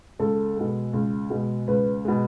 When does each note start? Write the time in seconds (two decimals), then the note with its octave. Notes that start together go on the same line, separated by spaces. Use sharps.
0.19 C#2 A4
0.56 B2 G#3
0.93 C#2
1.30 B2 G#3
1.68 C#2 B4
2.05 B2 G#3